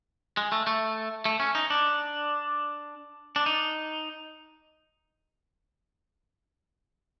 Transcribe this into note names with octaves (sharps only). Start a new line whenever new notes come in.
G#3
A3
A3
A3
C#4
D#4
D4
D4
D#4